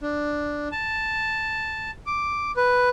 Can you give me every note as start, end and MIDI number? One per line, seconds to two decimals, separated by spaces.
0.01 0.68 62
0.72 1.91 81
2.06 2.51 86
2.57 2.89 71